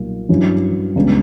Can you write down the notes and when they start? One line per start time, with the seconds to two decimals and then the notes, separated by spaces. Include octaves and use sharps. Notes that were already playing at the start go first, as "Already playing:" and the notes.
Already playing: B1 A#2 G3 A#3
0.29 G2 F#3 C#4 E4
0.96 C#2 C#3 G3 B3 D4